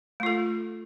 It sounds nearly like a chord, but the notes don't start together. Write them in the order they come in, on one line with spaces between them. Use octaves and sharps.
A3 F4 A4